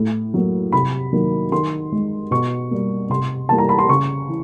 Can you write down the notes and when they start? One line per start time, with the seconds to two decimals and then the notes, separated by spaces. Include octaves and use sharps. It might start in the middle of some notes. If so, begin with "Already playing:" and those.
Already playing: A2
0.34 F#3 A#3
0.72 C3 B5
1.13 D#3 F#3 A#3
1.52 D#3 C6
1.92 G#3
2.31 B2 C#6
2.71 G3 A#3
3.10 C3 C6
3.49 E3 G3 A#3 A5
3.58 A#5
3.69 B5
3.79 C6
3.89 C#3 C#6
4.28 E3